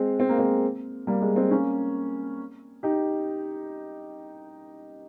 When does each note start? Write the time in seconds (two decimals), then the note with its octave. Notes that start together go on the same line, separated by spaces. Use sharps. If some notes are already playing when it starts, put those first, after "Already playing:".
Already playing: G#3 C4
0.20 C4
0.29 A#3
0.39 G#3 C4
1.07 G3 A#3
1.22 G#3
1.36 G#3 C4
1.51 A#3 C#4
2.83 D#4 G4